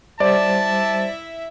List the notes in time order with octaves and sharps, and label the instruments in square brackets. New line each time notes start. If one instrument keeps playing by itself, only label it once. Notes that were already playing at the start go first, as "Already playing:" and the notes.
[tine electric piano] G3 C5 [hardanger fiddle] E4 E5 [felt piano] D5 [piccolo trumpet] A5